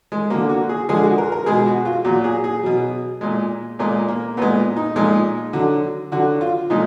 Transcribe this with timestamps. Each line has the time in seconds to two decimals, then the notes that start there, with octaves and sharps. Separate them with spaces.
0.12 G#3
0.30 D3 F#3 A#3
0.49 F#4
0.69 G#4
0.89 D3 F3 G#3 G#4
1.03 F#4
1.18 A#4
1.32 A#4
1.46 B2 G#3 G#4
1.66 F#4
1.85 F4
2.04 A#2 F#3 F#4
2.24 G#4
2.44 G#4
2.63 B2 F#3
3.21 A#2 G#3
3.79 A#2 G#3 A#3
4.08 A#3
4.37 A#2 G#3 B3
4.76 D#4
4.96 A#2 F3 G#3
5.53 D3 F#3
6.12 D3 F#3 F#4
6.41 F4
6.70 A#2 F3 G#3 D#4